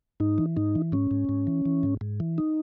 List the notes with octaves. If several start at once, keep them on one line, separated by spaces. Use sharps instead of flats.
G#2 D#4
E3
G#2 D#4
E3
G#2 C#4
G#2
G#2
E3
E3
G#2
G#2
E3
D#4